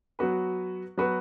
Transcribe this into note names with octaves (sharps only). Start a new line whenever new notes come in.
F#3 B3 F#4 B4
F#3 B3 F#4 B4